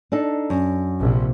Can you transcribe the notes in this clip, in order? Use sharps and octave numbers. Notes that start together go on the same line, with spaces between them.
D4 D#4 A4
F#2
A#1 C3